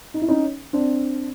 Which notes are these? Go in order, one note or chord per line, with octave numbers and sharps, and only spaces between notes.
D#4
E4
C#4 D#4
C4 D4